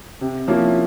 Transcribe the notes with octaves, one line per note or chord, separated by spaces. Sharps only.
C3
F3 A#3 C#4 E4